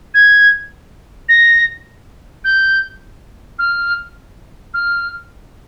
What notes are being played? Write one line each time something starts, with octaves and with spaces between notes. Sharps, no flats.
G#6
A#6
G6
F6
F6